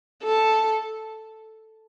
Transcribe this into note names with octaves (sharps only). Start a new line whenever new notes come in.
A4